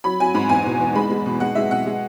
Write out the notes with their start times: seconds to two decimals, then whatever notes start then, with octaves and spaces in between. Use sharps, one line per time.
0.04 F#3 B5
0.20 F#3 G#5
0.34 G#2 B5
0.49 E2 G#5
0.66 B2
0.80 E2
0.95 G#3 B5
1.11 G#3
1.26 B2
1.40 G#3 F#5
1.55 G#3 E5
1.71 B2 F#5
1.86 G#3